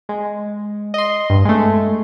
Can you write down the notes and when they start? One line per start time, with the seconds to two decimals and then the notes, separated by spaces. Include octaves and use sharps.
0.09 G#3
0.94 D#5 C6
1.30 G2
1.45 G#3 A3